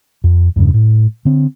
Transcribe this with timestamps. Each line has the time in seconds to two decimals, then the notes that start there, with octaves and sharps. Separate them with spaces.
0.24 F2
0.56 E2 G2 C#3
0.74 A2
1.25 D3 C4